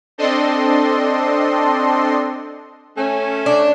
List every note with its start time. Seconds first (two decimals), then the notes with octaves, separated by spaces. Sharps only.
0.18 C4 D4 A4 D#5 C6
2.97 A3 C#4
3.46 D4